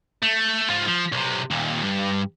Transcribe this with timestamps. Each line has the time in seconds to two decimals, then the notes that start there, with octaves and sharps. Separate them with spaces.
0.23 A3
0.70 G#2 F4
0.87 F3
1.12 B1 C3
1.51 D#2 A#2
1.83 G2